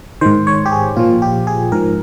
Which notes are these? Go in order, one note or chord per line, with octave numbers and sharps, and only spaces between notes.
G#2 D#3 C5
C#5
G4
G#4
A#2 F3 F4
G4
G#4
G#2 F3 A#4